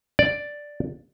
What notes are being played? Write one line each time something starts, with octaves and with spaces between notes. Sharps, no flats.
D5